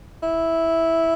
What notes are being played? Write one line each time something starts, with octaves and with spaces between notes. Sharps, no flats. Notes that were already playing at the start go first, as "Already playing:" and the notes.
E4